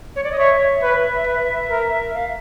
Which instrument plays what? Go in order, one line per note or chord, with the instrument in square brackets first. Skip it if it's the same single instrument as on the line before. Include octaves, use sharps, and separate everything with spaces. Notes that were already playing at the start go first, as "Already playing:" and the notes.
[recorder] C#5
D5
D#5
[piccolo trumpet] C#5 [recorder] E5
[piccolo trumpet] B4
B4
A#4
[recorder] F5